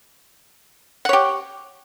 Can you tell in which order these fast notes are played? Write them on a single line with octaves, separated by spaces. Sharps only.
F#5 C#5 G4